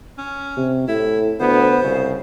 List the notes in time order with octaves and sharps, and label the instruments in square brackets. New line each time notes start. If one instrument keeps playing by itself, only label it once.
[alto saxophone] C#4
[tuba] C3
[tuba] A2 [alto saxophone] E4
[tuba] D2 [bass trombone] B3 [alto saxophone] C5
[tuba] C2 [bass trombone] C#3